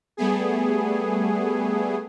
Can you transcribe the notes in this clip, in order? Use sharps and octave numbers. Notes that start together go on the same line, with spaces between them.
G3 A3 B3 G#4